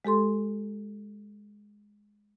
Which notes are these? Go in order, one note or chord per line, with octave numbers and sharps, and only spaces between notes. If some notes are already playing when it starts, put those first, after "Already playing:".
G#3 G4 A4 C6